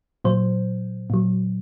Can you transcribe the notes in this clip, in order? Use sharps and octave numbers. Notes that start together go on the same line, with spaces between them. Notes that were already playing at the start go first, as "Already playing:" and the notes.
A#2 F#3 C5
A#2 F#3